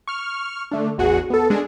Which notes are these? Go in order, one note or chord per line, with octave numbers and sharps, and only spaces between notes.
C#6 F6
D3 A3 D4
A1 E2 F#4 G#4 F#5
B3 A4
G#3 D4 G#4